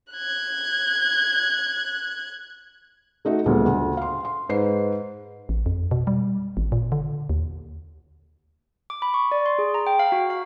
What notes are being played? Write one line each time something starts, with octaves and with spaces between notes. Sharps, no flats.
F#6 G#6
A3 D#4 F#4 E5
D2 G2 A#2 G#3 A3 B3
D2
F5 C6
C6
G#2 B4 C5 C7
A1
F2
B2
G3
G#1
A#2
D3
D#2
D6
B5
C#6
D5
C6
G#4
A#5
G5
F5
F#4
F5